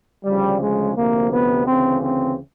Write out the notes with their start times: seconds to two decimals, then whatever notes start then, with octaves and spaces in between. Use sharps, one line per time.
0.25 D2 C#3 F3 G3
0.60 G#3
0.96 D2 C3 F3 A#3
1.31 B3
1.66 D2 C#3 E3 C4
2.02 C4